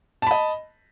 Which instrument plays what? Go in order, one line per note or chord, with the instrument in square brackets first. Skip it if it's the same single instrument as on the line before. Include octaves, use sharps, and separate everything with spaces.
[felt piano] A5
B5
D#5